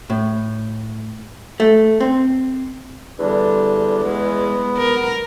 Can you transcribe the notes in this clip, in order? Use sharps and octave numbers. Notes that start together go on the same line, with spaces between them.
A2
A3
C4
E2 D3 G3 D4
G#3 B3
A#4